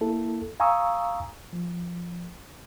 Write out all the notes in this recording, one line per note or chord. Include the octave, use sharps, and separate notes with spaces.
A#3 E4 A4
F5 G#5 A#5 C#6 D#6 E6
F3